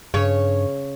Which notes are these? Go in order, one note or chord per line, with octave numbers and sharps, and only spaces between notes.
G2 C#3 C#5